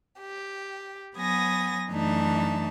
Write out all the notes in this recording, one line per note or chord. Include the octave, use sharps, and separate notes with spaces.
G4
F#3 B3 G#5 D#6 A#6
F#2 E3 A3 D4 D#4 A5